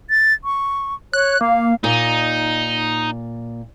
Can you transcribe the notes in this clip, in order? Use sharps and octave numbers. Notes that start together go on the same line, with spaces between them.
A6
C#6
C#5 F#6
A#3 F5
A#2 D#4